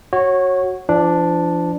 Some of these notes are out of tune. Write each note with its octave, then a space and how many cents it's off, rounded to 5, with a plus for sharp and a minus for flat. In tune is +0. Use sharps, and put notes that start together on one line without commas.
F#4 +0 C#5 -20
F3 -35 D4 +0